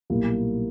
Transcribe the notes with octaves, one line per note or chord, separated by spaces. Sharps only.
B1 A#2 G3 A#3 E4